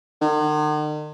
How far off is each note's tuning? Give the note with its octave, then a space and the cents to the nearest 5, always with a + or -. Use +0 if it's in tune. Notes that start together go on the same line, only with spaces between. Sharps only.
D#3 -45